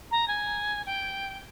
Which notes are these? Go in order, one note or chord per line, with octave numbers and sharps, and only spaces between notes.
A#5
G#5
G5